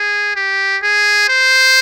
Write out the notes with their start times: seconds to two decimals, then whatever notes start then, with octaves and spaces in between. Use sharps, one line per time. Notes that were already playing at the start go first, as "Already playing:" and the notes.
Already playing: G#4
0.36 G4
0.83 G#4
1.29 C5